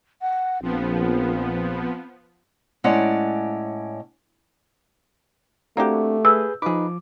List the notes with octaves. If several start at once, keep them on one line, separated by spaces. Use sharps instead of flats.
F#5
A#1 F3 B3 C4
A2 G#3 C#4 D5 F#5 A#5
A3 A#3 C4 D4 F#4 G4
G#4 B4 E6 G6
F3 D#4 G#4 B4 D6